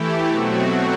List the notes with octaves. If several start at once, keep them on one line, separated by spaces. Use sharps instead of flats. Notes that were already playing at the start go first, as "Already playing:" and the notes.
Already playing: E3 A3 E4 G4
B2 F#3 A3 C4 F#4